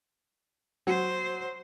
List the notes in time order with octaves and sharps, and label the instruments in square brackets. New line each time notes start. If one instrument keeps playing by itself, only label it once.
[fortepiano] F#3 [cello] C5